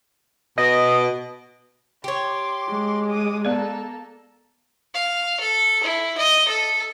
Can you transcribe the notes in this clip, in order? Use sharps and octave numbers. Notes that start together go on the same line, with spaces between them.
B2 D#5
G4 C#5 C6 D6
G#3
D6 D#6
A#3 B3 A4 D5
F5
A4
E4
D#5
A4